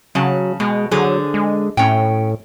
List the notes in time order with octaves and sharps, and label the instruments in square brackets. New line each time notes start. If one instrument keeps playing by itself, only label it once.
[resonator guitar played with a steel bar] C#3 A5 [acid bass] F#3
[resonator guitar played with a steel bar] B2 [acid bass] G#3
[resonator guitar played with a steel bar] D3 G#4 C5 [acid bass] F#3
[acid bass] G#3
[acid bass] A2 [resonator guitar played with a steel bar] C#4 G5